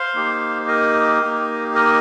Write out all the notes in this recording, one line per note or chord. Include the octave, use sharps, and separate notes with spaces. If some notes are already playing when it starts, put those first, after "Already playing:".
Already playing: C5 F5
A#3 D#4 G4
A#4 D#5
A#3 D#4 G4
A#4 D#5